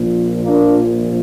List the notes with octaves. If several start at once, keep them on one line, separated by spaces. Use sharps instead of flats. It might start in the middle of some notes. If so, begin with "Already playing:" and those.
Already playing: A#1 A#2 F3
A#3 D4